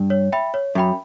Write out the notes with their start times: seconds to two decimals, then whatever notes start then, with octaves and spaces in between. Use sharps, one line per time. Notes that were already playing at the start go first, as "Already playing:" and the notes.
Already playing: G2
0.10 C#5
0.32 E5 G5 B5
0.54 C#5
0.75 F#2 E5 G5 B5